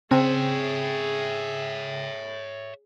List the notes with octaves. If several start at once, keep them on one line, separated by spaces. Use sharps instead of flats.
C#3 C4 G#4 C#5 E5 G5